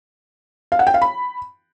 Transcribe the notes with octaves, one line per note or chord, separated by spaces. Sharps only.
F5
F#5
G5
F5
B5